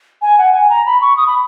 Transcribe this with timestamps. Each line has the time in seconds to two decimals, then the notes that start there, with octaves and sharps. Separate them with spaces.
0.22 G#5
0.38 F#5
0.53 G#5
0.70 A#5
0.86 B5
1.01 C#6
1.17 D#6
1.27 B5